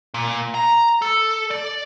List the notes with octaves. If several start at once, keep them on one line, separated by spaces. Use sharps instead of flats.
A#2
A#5
A4
D5